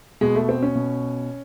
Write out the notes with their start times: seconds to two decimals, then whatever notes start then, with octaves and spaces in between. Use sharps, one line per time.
0.21 B2 G#3
0.35 A3
0.49 C4
0.62 C#4
0.75 B2